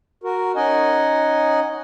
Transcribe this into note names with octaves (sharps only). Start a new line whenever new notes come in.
F#4 A#4
C#4 D#4 D#5 F#5 G#5